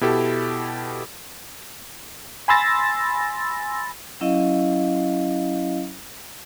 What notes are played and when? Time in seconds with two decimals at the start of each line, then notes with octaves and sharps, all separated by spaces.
0.01 B2 E4 G4 A4
2.48 G#5 B5 C6 E6 A6 A#6
4.20 F#3 C#4 E4 D#5 F5